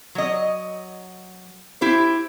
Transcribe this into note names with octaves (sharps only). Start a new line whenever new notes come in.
F#3 D#5
E4 G4 C5